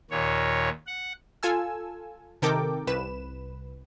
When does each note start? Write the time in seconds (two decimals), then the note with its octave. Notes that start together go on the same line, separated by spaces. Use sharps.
0.11 D#2 A#2 C#5
0.87 F#5
1.43 F4 A4 G#5 E6
2.42 C3 D#3 A4 A#4 G5 D6
2.87 C2 B4 E7